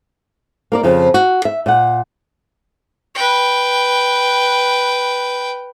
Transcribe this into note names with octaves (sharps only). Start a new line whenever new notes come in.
A#3 A#4 D5
F2 C#3 F3
F#4
E5
A#2 F#5
B4 G5